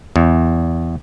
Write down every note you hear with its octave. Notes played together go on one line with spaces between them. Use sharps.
E2